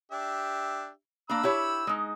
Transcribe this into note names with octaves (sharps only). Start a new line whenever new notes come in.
D4 G4 E5
A#3 D4 B5 E6
E4 G4 C#5
G#3 D#4